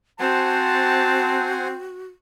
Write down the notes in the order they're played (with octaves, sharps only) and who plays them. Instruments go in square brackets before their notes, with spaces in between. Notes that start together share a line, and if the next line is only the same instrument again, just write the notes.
[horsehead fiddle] C4 [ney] F#4 [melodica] C5 F#5 G#5 [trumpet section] A5